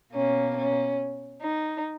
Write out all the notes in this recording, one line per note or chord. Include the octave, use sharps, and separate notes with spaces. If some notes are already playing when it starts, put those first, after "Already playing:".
B2 A#3 C#4
C#4
D#4